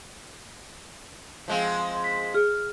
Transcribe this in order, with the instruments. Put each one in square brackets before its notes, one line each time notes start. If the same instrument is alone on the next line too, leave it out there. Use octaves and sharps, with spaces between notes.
[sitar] F3 G#3 C4
[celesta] B6
[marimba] G#4 [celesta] F6